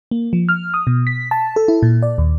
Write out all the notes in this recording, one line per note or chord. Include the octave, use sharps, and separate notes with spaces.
A#3
F3
F6
D#6
B2
B6
A5
A4
E4
A#2
D5
D#2